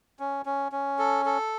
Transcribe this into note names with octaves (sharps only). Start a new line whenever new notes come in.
C#4
C#4
C#4
A4
A4